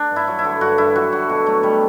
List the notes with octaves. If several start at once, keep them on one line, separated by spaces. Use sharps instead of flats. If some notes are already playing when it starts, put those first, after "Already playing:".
Already playing: D4
G2
E4
F#3
E4
D3
G2 F#4
G2 E4
F#3 F#4
D3 F#4
B2 F#4
F#3 A3
B2 G3